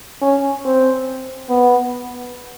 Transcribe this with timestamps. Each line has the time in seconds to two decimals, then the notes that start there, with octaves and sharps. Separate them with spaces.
0.21 C#4
0.65 C4
1.49 B3